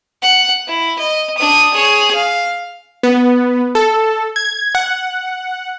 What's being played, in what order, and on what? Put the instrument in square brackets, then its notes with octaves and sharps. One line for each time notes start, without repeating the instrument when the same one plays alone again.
[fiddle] F#5
E4
D#5
D4 D#6
G#4 C#5
F5
[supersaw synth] B3
A4
G#6
F#5